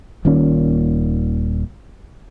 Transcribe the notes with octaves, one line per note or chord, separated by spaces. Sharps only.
D#1 D#2 A#2 C#4